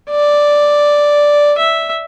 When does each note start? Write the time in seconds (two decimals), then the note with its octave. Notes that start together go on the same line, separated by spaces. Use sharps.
0.10 D5
1.58 E5